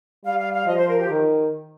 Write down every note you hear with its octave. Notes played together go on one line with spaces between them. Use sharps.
G3 F5
F5
F5
F3 D#5
C5
A#4
G4
D#3